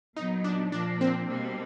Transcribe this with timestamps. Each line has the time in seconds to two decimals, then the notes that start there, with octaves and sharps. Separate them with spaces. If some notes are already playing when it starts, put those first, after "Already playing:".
0.17 A#2 F#3 B3 D#4
0.44 D4
0.72 A#2 F3 A#3 D4
1.01 C4
1.30 B2 G3 A#3